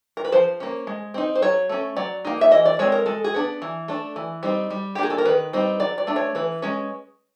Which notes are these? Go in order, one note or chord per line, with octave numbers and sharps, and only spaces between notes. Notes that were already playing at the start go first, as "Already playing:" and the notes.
A#4
B4
F3 C5
A#3 C#4
G#3
C4 D#4
C5
F#3 C#5
A3 C#4
F#3 D5
A#3 D#4
E5
E3 D#5
D5
G#3 C4 C#5
A#4
G#3 A4
G#4
B3 D4
E3
A3 D4
E3
G3 C4 D#4
G3
G4
A#3 D4 G#4
A4
A#4
D#3 B4
G3 C4 D#4
F#3 D5
D5
A3 D4
C#5
E3 B4
G#3 C#4